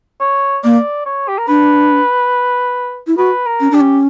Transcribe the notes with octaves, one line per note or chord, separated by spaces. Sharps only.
C#5
A#3 D5
C#5
G4
A#4
D4 B4
E4
F#4 B4
A#4
C#4
D4 G4
C#4